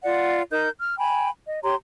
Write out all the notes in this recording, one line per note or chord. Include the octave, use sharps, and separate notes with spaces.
F4 D5 F#5
D#4 A#4 G6
F6
G5 G#5 B5
D#5
G4 C#5 A#5 C6